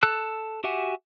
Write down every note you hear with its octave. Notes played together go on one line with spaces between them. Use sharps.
A4 A5 E6 F#6
F#4 G4 E5 F#5 G#5